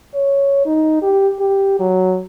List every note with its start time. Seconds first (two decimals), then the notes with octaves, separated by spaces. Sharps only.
0.15 C#5
0.65 D#4
1.02 G4
1.40 G4
1.80 F#3